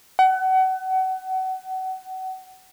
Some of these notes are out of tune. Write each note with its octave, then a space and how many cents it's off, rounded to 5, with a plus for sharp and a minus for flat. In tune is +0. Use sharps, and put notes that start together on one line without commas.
F#5 +30